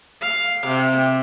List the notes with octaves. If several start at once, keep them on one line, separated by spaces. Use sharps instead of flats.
F5
C3